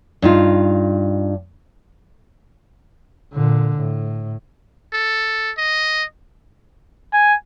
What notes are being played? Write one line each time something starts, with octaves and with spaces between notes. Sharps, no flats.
G2 D#4 F4
A#2 D3
A2
A4
D#5
G#5